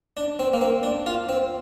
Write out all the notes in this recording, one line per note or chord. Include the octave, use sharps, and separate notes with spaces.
D4
C4
A#3
C4
D4
F4
C4